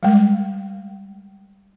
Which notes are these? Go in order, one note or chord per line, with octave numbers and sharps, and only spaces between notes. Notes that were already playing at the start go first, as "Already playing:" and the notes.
G3 G#3